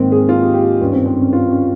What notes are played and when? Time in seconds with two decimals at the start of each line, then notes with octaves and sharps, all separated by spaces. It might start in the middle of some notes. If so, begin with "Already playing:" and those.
Already playing: G#2 D#3 A#3 C4
0.12 G#4
0.29 F4
0.42 G4
0.54 G4
0.81 G2 D#3 C#4
0.93 C4
1.06 C4
1.20 C#4
1.33 F4
1.50 C#4